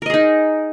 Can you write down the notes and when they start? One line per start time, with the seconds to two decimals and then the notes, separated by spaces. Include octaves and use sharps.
0.02 A#4
0.06 D#5
0.10 G#4
0.14 D#4